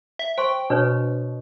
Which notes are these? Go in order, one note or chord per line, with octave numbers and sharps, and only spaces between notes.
E5
C5 G5 C6 C#6
B2 D4 B4 C#5